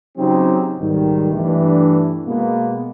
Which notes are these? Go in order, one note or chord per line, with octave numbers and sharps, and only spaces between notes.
C#3 F#3 C4 D#4 G4
B1 G#2 D#3 G3
G2 E3 A3 D4
B2 G#3 A#3 B3